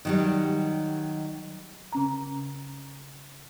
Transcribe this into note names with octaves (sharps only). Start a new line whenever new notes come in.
D#3 F#3 G3
C#3 C#4 A#5